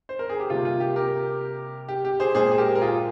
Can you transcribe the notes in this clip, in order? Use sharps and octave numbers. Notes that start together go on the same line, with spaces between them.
C5
A#4
G#4
G4
C3 G3 A#3 F4
F4
G4
G4 A#4
G4
G4
G#4 C5
A#2 G#3 G#4 C5
G#4
G4 A#4
A#4
F4 G#4